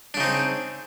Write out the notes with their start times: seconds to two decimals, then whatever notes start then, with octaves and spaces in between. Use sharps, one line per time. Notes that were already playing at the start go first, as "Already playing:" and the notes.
0.14 D4
0.17 C#3
0.20 D#4
0.23 C4